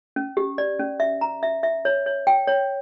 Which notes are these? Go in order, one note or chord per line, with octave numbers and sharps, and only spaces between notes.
C#4
G4
D5
C#4
E5
A#5
E5
E5
C#5
C#5
G5
C#5